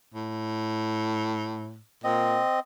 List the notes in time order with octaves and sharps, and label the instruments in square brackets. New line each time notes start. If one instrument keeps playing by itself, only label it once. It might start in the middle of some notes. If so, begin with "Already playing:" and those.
[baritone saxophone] A2
[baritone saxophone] A#2 [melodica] C4 D#5